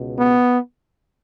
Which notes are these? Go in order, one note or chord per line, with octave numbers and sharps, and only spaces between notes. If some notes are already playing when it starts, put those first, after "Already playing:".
Already playing: C#2 B2
B3